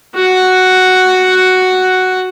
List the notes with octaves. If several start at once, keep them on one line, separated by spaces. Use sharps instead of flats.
F#4 F#5